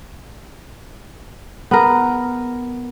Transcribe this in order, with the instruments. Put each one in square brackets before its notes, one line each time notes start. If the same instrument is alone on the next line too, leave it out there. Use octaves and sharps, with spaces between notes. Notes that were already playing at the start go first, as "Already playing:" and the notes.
[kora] B3 A#4